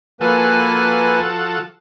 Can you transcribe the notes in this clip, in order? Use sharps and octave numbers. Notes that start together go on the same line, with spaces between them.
F3 A#3 F#4 A4 B4 G#5